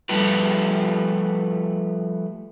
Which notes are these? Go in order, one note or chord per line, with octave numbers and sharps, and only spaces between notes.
F3 G3 A3 F4 G4 B4